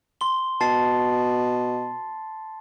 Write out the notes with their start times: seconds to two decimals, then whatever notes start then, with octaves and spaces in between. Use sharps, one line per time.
0.21 C6 G7
0.61 B2 A5 A6 C7